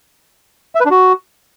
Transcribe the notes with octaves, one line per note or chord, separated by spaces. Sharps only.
E5
B4
D4
F#4